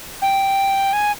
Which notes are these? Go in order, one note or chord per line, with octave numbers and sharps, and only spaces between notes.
G5
G#5